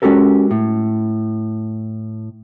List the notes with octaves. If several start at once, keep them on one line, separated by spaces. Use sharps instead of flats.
G#3 C#4 F#4 G4 A4 A#4
A2